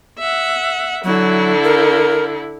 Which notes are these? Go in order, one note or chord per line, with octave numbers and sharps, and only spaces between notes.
E5 F#5
D3 F#3 E4
A#4